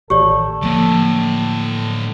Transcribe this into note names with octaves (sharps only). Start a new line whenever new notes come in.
A1 D#3 G4 A4 C#5 D5
A2 D3 F3 A#3